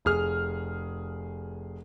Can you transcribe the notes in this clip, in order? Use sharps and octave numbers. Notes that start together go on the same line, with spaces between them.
F1 G#4 F6